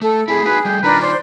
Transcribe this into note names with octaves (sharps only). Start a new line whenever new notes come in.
A3 A4
A3 C4 E4 G#4 B5
D#4 F#4 B4
G3 A3 G5
D#3 D4 D#4 F4 A#4 B4
C5 D5 C6